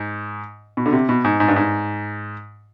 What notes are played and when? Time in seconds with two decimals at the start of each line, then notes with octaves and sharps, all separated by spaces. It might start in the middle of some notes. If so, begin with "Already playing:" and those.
Already playing: G#2
0.77 B2
0.86 D3
0.93 C3
1.09 B2
1.24 G#2
1.40 G#2
1.48 G2
1.56 G#2